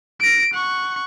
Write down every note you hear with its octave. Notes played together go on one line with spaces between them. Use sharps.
A#6 D7
F#5 C#6